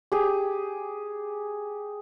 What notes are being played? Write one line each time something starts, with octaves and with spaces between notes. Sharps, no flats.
G4 G#4